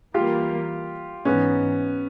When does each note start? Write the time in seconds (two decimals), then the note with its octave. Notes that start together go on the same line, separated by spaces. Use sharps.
0.14 E3 G3 A#3 F4 G4
1.25 G#2 E3 B3 C#4